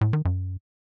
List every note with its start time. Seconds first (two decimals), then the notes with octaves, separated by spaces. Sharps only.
0.01 A2
0.13 D#3
0.25 F#2